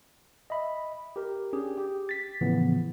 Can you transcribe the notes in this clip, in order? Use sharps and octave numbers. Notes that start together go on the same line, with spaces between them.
D#5 E5 B5
G4 A#4
C#4 D4 G4 G#4
G4
A6 B6
A2 C#3 E3 F3 B3